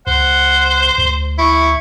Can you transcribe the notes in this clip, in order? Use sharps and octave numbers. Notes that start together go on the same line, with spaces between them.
C#2 C5 F#5
D2
E4 C#6